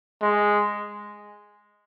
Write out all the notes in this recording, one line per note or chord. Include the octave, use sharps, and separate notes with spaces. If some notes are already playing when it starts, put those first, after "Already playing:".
G#3